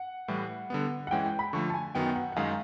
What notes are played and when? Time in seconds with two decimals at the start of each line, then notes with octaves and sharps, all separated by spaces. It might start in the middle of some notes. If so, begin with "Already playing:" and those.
Already playing: F#5
0.28 A2 E3 G3
0.70 D3 G3 B3
1.07 F#5
1.11 E3 G#3 C#4 E4 G5
1.26 G5
1.39 B5
1.53 D3 F3 A3 C#6
1.70 A5
1.74 G#5
1.95 F#2 D#3 F#3 B3 G5
2.16 F#5
2.32 F#5
2.36 F#2 D#3 G#3 F5